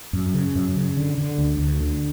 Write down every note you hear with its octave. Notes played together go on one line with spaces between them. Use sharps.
F#2
C#3
F#2
C#3
D3
D3
D2
D2
D3